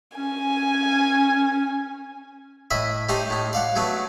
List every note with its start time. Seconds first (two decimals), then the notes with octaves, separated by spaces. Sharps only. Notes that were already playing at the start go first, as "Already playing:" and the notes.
0.18 C#4 G#5
2.71 A2 D#5 E5 B5
3.09 A3 D4 D#4 G4 C5 D#6
3.30 A2 D#4
3.53 D5 F5 F#5
3.76 F#3 A3 B3 D4